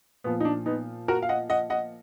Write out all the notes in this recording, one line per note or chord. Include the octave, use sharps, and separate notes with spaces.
A#2 F3 B3
D#4
D4
B3 D#4
F#4 A#4
F5
D#5 F#5
D#5 F#5
D#5 F#5